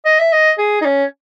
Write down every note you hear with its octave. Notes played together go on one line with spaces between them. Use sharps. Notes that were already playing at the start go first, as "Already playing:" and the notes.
D#5
E5
D#5
G#4
D#4
C#4